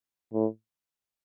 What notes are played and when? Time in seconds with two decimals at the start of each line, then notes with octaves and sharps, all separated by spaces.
0.33 A2